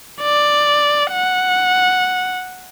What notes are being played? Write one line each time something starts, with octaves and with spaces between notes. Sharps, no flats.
D5
F#5